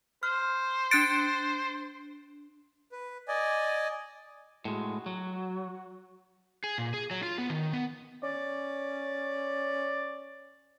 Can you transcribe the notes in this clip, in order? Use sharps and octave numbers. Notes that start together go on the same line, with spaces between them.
C5 F6
D4 F#6 A6 C#7 D7
B4
D5 D#5 G#5
A2 G#3 F#4
F#3
G#4
A#2
G#4
F#3
F4
B3
D#3
B3
C#4 D5